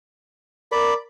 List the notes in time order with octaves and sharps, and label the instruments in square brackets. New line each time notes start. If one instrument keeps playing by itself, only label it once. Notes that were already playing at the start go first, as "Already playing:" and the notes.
[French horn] A#4 [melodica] D5 B5